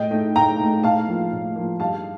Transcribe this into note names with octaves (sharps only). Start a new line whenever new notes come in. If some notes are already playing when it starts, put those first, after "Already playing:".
Already playing: A2 D#5 G5
A3 D#4
A2 G5 A#5
A3 D#4
A2 F5 A5
F3 A#3
A2
F3 A#3
G2 F5 A5